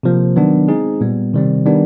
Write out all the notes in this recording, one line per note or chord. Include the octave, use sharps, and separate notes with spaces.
C3 F3 A#3
D#3 F#3 B3 D4
G#3 C4 D#4 G#4
A#2 G3 B3
C3 D#3 G3 C4
D#3 G3 B3 D4